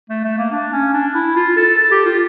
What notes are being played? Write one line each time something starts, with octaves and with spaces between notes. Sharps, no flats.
A3
A3
A#3
D4
C#4
D4
E4
F4
A4
A4
G4
F4